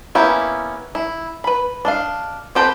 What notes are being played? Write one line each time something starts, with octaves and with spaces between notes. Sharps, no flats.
A#3 B3 C#4 E4 G4
E4
B4 B5
D4 D#5 F5
C4 G4 A4 B4